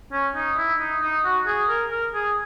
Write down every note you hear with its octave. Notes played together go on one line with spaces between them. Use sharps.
C#4
D#4
E4
D#4
D#4
F#4
G#4
A#4
A#4
G#4